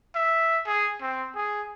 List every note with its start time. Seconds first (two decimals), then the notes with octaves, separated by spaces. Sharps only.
0.15 E5
0.66 G#4
1.01 C4
1.35 G#4